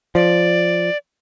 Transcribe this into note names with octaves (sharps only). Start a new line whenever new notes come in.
F3 D5